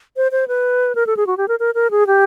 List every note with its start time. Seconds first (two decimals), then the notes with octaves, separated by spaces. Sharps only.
0.17 C5
0.32 C5
0.48 B4
0.95 A#4
1.07 A4
1.17 G#4
1.27 F#4
1.37 G4
1.48 A#4
1.60 A#4
1.75 A#4
1.91 G#4
2.07 G4